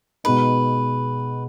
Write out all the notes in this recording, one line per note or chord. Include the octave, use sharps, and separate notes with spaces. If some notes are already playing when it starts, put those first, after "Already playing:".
B2 G#3 B3 D#4 B4